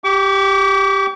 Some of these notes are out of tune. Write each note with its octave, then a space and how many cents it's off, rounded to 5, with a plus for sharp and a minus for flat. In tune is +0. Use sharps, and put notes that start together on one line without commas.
G4 +0 D6 -45